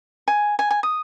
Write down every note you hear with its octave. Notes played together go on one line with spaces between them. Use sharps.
G#5
G#5
G#5
D#6